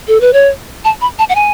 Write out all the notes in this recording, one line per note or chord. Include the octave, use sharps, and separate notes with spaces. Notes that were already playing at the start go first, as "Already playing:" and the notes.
A4
B4
C#5
A5
B5
A5
F#5
G#5